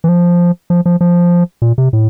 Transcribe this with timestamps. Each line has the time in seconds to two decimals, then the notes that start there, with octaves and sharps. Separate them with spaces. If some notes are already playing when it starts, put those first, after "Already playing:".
0.04 E3
0.09 F3
0.70 F3
0.86 F3
1.01 F3
1.62 A#2
1.78 C3
1.93 A2